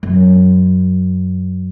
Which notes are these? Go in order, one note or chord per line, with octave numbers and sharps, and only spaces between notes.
F#2